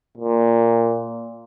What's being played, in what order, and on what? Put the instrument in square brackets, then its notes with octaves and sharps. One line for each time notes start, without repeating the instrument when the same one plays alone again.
[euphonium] A#2